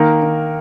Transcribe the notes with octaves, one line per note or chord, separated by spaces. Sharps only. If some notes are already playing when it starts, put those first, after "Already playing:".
Already playing: D#3 A#3 A#4
D#3